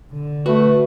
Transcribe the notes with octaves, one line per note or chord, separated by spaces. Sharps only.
D3
A3 F#4 B4